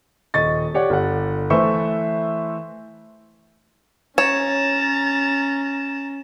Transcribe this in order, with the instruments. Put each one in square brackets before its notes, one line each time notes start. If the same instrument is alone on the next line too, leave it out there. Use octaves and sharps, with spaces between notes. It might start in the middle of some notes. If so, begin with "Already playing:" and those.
[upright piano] D#1 D#5 C#6 A6
G4 C#5 D5 F#5
G1 F#5
E3 A3 B4 C5 E5 C#6
[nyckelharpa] C#4 [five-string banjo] C#5 [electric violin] A#5 A6 [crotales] E7